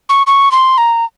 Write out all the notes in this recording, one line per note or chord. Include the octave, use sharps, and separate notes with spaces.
C#6
C#6
C6
A#5